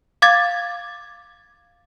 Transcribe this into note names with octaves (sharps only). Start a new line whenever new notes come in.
F5 D6 G#6 A6